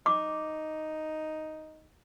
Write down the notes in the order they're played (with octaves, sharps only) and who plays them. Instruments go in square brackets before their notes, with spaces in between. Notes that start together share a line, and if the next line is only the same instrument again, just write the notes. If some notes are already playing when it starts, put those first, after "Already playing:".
[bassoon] D#4 [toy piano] D6